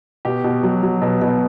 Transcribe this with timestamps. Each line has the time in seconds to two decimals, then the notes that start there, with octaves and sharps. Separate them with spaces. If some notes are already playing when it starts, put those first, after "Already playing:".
0.25 B2 G4
0.44 B2
0.63 F#3
0.83 F#3
1.02 B2
1.21 B2